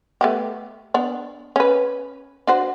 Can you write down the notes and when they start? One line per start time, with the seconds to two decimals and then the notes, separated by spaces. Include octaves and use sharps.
0.21 A3 B3 G4
0.94 B3 D4
1.56 C#4 B4
2.47 D4 F#4 C5